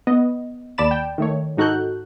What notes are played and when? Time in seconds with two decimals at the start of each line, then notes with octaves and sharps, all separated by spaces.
0.07 B3 D#5
0.78 D#2 D5 A5 B5 A6 E7
0.91 G5
1.18 D#3 A3 C#5
1.57 G#2 D#4 F#4 A4 F#6 G6